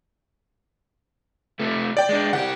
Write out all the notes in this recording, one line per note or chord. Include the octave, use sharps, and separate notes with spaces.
C3 A3
D5 G5
G#3 D4
C2 G4 F#5